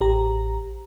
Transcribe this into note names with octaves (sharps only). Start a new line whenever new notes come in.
A1 G4 A#5